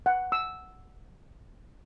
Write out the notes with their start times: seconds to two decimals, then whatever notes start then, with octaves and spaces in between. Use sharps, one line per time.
0.06 F#5
0.32 E6